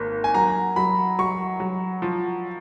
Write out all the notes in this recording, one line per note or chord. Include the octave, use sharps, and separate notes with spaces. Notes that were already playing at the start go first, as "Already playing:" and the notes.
Already playing: G#1 A#3
G#5
F#3 A#5
F#3 B5
F#3 C#6
F#3
F3